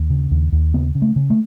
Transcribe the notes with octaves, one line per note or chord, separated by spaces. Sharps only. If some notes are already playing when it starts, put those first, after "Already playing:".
Already playing: D#2
C#3
D#2
D#2
C#3 B3
C#3
A3
C#3
A3